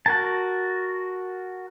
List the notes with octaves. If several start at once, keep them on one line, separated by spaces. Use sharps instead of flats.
F#4 A#4 A5